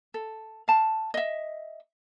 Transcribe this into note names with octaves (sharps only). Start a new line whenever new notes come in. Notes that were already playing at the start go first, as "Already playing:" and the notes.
A4
F5 A5
D#5 E5